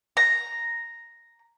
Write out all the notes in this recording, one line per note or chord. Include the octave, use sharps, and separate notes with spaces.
A#5